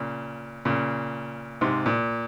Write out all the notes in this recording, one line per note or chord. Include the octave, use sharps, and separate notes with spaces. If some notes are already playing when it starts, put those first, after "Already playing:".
Already playing: A#2 C#3
A#2 C#3
G#2 C3
A#2